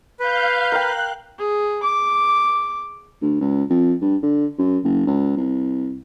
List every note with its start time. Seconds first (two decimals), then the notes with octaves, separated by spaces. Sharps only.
0.20 B4 F5 G6
0.72 A#4 F5 G5 F#6
1.38 G#4
1.83 D6
3.22 D2
3.41 C#2
3.70 F2
4.02 G2
4.22 D3
4.58 F#2
4.84 F#1
5.07 C#2
5.37 C2